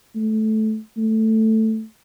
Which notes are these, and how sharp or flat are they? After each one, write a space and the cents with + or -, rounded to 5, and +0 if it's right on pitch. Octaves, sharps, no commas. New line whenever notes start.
A3 -15
A3 +5